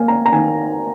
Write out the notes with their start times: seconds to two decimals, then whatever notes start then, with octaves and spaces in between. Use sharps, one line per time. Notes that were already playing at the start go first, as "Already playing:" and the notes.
Already playing: A#3 F5 G#5
0.08 A#5
0.26 A#5
0.32 D#3 G#5